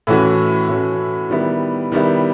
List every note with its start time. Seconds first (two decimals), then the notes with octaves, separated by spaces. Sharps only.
0.07 A2 E3 A3 C#4 F#4
0.68 A2 E3 A3 C#4 F#4
1.30 D#3 G3 B3 E4
1.92 D#3 G3 B3 E4